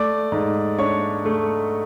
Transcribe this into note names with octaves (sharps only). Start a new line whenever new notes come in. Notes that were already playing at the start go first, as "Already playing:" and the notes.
Already playing: A3 D5 D6
G#2
D4 C#5 C#6
A3